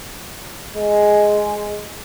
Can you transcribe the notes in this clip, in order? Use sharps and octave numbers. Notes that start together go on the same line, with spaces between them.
G#3